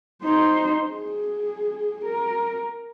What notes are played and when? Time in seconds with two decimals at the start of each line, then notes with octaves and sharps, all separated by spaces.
0.23 D#4 C5
0.91 G#4
2.05 A#4